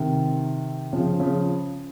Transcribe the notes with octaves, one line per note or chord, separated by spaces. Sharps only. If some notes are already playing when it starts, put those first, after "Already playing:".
Already playing: C3 D#3
C#3 F3
C#3 F3